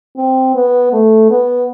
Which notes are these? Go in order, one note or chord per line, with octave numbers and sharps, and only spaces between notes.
C4
B3
A3
B3